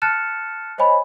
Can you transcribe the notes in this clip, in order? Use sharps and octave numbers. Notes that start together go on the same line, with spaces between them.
A5 F6 F#6 A6 C#7 E7
C5 C#5 D#5 G#5 B5